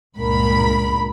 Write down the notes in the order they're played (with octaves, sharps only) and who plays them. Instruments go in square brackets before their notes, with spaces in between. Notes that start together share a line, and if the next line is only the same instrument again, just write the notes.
[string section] C#2 G2 A#2 A#4 B5